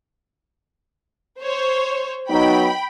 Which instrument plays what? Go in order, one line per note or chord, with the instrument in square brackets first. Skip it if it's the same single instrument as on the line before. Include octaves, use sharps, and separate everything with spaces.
[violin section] C5 C#5
[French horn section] F#3 B3 D#4 [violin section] G5 B5